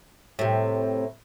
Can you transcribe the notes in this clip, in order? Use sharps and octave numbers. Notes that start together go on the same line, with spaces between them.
A2 C3